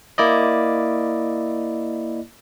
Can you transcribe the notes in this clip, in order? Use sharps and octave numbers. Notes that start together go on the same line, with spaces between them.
A#3 E4 D5 D#5